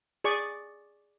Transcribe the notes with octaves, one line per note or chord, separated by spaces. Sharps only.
G#4 D5 C#6